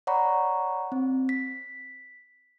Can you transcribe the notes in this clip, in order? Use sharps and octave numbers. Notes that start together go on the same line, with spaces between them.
C#5 D5 F#5 A#5 B5 C#6
C4
B6